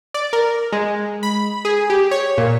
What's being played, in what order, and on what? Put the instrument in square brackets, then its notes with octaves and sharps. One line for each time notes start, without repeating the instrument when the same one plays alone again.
[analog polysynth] D5
A#4
G#3
B5
G#4
G4
C#5
A#2